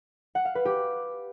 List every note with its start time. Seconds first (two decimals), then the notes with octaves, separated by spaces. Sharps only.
0.35 F#5
0.45 F5
0.55 B4
0.65 G4